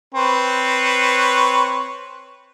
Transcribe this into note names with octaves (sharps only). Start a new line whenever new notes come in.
C4 B4 C#5